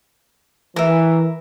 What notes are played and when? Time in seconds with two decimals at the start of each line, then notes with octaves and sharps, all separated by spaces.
0.76 E3 A#4 E5